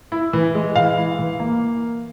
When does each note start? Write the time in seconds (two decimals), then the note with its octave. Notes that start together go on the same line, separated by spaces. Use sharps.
0.12 E4
0.33 E3
0.55 G#3
0.76 E3 F5
0.98 E4
1.19 E3
1.40 A#3